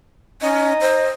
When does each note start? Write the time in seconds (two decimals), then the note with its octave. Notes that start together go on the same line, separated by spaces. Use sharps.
0.42 C#4 D#4 D#5
0.81 C5